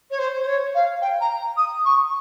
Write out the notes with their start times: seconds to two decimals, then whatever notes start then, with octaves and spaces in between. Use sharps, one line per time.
0.10 C#5
0.18 C5
0.42 C5
0.47 C#5
0.74 F5
1.01 G5
1.21 A#5
1.57 D#6
1.85 C#6